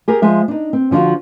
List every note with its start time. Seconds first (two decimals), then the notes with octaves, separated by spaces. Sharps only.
0.08 G4 G#4 A#4
0.22 F3 G#3 E5
0.48 D4 D#4
0.73 C4
0.91 D3 F3 D4 F4 F#4